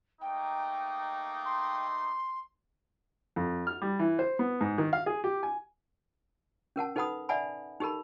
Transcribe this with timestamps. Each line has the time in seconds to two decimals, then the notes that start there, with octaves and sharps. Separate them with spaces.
0.21 A3 A#3 D#4 G5
1.45 C6
3.36 F2
3.67 F6
3.82 G3
3.99 E3
4.19 C5
4.39 B3
4.61 G#2
4.78 D#3
4.93 F5
5.06 G#4
5.24 G4
5.43 G#5
6.76 C#4 A#4 F#5 A5
6.96 D#4 A4 B4 F#5 B5 D#6
7.29 D5 E5 F#5 G#5 A5 B5
7.80 D#4 G4 A4 A#4 B5